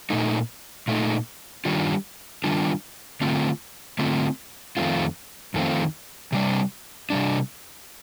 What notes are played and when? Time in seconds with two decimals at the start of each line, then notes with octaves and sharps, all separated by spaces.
0.10 A#2 A3 D#4
0.88 A#2 A3 D#4
1.65 D#3 G3 D4 F4
2.44 D#3 G3 D4 F4
3.21 D3 A3 C4 F4
3.99 D3 A3 C4 F4
4.77 F2 D#3 A3 C4 F4
5.54 F2 D#3 A3 C4 F4
6.32 C3 G3 D4
7.10 C3 G3 D4